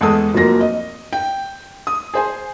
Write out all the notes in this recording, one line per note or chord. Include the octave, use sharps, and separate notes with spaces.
E2 G#3 A4 D#6
F1 F3 F#3 A#3 A#6
D#5
G5
D#6
G#4 C5 G#5